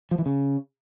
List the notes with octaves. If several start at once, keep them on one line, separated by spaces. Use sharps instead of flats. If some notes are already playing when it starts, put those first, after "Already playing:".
F3
E3
C#3